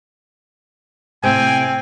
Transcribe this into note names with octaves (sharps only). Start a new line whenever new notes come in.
A2 C3 C4 G5 G#5